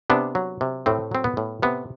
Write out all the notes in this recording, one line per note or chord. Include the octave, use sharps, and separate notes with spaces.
C3 B3 D4
F#3
C3
A2 A3 C4
F#3 C4
B3
A2
C3 B3